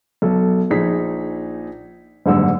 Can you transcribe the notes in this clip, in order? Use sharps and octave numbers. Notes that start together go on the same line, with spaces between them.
B1 A4
A#1 D#4 G#4 B6
F#1 G#2 D3 G3 E6